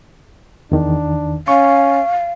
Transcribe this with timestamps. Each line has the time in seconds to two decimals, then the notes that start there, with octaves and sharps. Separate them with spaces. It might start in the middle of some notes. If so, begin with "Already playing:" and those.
0.72 E2 D#3 D4
1.48 C#4 F5 C#6